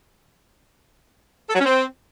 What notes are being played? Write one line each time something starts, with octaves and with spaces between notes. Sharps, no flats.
A4
F#3
C#4
C4